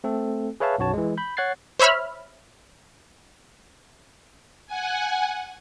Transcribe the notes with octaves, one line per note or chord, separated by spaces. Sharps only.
A3 C4 A4
G#4 B4 C#5 E5 F5 A5
B1 F#2 F#4 C#5 A5
E3 G#3
B5 G6
C#5 F#5 F#6 G#6 A6 C7
C5 C#5 E5 B5 F6
F#5 G#5